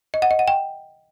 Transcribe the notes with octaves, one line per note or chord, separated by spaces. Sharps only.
D#5
F#5
D#5
F#5
G5